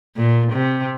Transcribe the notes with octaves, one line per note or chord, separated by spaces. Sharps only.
A#2
C3